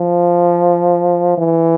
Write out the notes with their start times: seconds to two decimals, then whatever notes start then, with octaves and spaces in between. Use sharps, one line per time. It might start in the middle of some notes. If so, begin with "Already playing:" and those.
Already playing: F3
1.38 E3